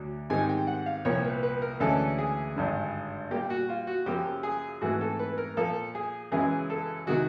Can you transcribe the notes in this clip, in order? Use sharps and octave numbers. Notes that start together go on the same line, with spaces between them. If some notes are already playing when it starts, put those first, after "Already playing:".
Already playing: D2 F#3 D4
G#2 D#3 G3 C4 D#4 G#5
G5
F#5
F5
C2 A#2 F3 A#3 C#5
B4
B4
A#4
D2 C#3 E3 G#3 C#4 A4
G#4
G#1 G2 D3
A#2 G3 A#3 G4
F#4
F4
F#4
F#2 C#3 F3 A#3 G4
G#4
G#2 E3 A3 C4 F#4
A4
B4
A#4
A#2 F3 A#3 A4
G#4
F#2 C#3 E3 G#3 G#4
A4
C3 D#3 G#3 F#4